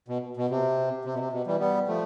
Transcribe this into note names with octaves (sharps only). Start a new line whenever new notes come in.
B2
B2
C3
C3
B2
C3
B2
E3 G3
G3 B3
F3 A3